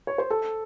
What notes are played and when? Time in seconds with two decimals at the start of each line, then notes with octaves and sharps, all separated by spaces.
0.07 C#5
0.18 C5
0.30 A4